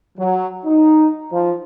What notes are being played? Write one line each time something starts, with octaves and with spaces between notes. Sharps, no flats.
F#3
D#4
F3